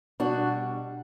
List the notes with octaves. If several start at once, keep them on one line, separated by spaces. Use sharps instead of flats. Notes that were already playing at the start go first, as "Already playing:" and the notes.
B2 G3 D4 F#4